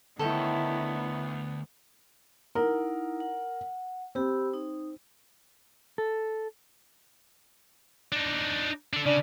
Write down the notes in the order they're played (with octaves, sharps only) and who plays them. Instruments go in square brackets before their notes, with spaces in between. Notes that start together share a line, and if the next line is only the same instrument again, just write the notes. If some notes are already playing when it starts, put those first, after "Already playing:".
[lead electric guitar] D2 [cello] D#3 E4 [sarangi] B3 [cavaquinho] A4 C#5 G5
[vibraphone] D#4 E4 F#5 [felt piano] A#4
[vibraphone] F#5
[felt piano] C4 [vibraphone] G4 B5 E6
[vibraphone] D#4
[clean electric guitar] A4
[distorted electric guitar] D4 D#4
D4 A4
[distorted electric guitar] C#3 [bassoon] D4